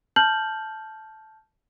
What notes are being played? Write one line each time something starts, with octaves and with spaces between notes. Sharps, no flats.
A5 F6 G6 F#7